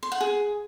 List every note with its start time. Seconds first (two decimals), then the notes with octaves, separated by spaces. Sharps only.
0.03 C6
0.12 F#5
0.21 G#4